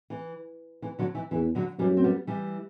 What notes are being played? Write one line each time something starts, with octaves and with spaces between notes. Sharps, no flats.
E3
E3
D3 F#3
E3
E2 E3
D3 F#3
F#2 E3 G3
C4
G3 B3
E3 G3